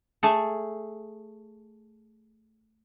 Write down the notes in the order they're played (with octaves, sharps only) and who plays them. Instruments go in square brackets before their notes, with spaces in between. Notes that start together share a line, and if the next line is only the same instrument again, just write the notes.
[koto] A3 G#4 A4